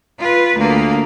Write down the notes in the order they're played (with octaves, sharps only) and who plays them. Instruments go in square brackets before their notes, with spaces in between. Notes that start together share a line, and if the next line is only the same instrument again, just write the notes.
[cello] F4 B4
D2 A#3